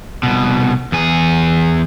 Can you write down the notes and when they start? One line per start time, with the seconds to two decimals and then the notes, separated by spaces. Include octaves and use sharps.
0.23 C2 B2
0.92 E2 G#4